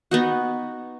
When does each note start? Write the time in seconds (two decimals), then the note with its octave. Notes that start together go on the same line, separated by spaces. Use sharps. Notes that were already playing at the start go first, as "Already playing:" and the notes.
0.11 B3 D#4 F#4